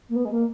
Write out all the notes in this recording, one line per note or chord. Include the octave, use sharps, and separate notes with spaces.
A#3
B3
G#3
A#3